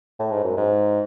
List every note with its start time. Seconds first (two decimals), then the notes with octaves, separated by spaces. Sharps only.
0.20 A2
0.31 G#2
0.44 F#2
0.57 G#2